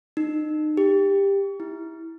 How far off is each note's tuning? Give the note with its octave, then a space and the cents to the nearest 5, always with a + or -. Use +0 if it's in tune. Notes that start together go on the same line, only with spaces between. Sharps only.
D#4 -30
G4 +15
E4 -10